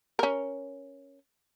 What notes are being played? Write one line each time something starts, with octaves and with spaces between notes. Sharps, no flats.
C#4 A#4